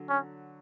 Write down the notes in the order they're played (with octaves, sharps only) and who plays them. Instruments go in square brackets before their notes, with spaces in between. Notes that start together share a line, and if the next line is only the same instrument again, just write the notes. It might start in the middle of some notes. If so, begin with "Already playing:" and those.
Already playing: [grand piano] D3 F#3
[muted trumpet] C#4